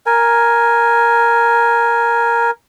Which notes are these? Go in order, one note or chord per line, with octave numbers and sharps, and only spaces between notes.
A#4 G#5